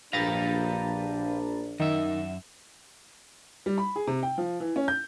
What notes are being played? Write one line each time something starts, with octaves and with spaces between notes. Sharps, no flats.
A#1 D4 G4 B4 F5 A#5 B5 A6
F#2 D#3 E5
G3
B5
G#4
C3
G5
F3
E3
C#4
G6